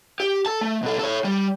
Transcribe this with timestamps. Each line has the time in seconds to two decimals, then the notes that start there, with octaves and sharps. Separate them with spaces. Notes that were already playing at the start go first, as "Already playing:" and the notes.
0.20 G4
0.46 A4 A5
0.61 A3
0.83 B2 A4
0.99 A4 C#5
1.24 G3